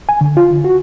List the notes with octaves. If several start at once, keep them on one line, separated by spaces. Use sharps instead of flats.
G#5
D3
F4
D3
F#4